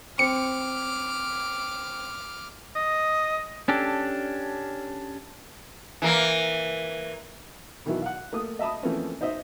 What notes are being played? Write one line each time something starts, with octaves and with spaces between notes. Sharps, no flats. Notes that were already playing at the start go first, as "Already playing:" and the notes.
C4 D6 F6 C#7
D#5
C#4 D4 G4 A4
E3 A#3
B2 D#3 E3 F#3 E4
F5 F#5
A3 A#3 D#6
D#5 E5 A5 B5 D#6
E3 F3 A3 A#3 C4 C#4
D#4 C5 D#5 E5